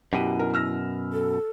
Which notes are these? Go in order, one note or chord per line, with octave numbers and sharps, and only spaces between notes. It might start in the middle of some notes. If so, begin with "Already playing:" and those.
F#2 B2 E4 G4 D#7
A#4
E6 F6 A#6
A4